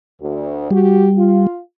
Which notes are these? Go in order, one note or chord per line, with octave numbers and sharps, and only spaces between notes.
D2
G3 F#4 G4
F4